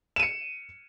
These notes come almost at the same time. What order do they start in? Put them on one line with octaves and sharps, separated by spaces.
E7 D#7 C#7